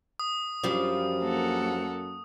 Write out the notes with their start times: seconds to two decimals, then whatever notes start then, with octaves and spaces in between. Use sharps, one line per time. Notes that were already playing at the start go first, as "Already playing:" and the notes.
0.19 D#6
0.64 F#2 F3 G3 D4
1.21 A#3 A4 F#5